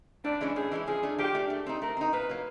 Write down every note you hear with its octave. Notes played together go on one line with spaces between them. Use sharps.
A2 D4
E3 G#3 C#4 E4
A2 G#4
E3 G#3 C#4 E4
F3 G#4
A3 D4
F3 G4
A3 D4
A3
C4 D#4
A3 A#4
C4 D#4
A#2 B4
F#3 A#3